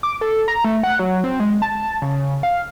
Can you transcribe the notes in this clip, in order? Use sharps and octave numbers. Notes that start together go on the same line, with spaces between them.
D6
A4
A#5
A3
F#5
F#3
C4
G#3
A5
C#3
F5